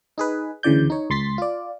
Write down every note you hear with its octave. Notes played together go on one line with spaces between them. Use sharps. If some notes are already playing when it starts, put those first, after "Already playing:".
D#4 G#4 B4
D2 C#3 E3 D5 G6
D#4 C#5
C#2 C6 A6 B6 C7
F4 D5